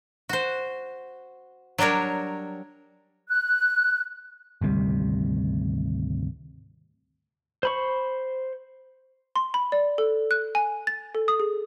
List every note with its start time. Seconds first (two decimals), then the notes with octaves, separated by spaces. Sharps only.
0.29 F#4 C5
1.78 F#3 G3 D4 A#4 C#5
3.29 F#6
4.61 G#1 D2 C3 G3
7.63 C5 B5 C#6
9.36 C6
9.54 B5
9.72 D5
9.98 A4
10.31 F#6
10.55 G#5
10.87 A6
11.15 A4
11.28 D#6
11.40 G#4